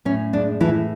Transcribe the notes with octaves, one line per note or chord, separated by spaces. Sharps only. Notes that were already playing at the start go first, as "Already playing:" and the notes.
A2 C#4
G#3 D4
A2 E3 E4